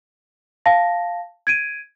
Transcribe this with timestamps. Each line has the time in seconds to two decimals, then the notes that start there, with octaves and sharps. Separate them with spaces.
0.66 F5 A5 A#6
1.47 G#6 D7 D#7